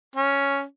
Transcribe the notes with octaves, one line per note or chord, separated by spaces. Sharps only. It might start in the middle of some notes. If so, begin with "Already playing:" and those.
C#4